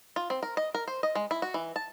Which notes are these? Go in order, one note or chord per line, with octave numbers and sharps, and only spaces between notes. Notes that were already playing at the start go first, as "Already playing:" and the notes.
F4
C4
A#4
D#5
A#4
C5
D#5
G#3
E4
F#4
E3
A5